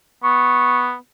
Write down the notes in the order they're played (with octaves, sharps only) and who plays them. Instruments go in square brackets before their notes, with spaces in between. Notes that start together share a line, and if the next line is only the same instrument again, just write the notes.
[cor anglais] B3 [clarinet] C#6